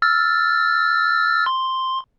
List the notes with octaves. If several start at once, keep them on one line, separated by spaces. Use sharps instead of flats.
E6 F6 A6
C6